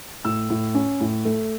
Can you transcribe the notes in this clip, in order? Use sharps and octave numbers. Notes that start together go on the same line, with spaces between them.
A2 E6
A2
C#4
A2
A3